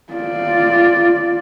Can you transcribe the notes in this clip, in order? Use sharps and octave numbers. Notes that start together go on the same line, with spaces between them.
F4 D5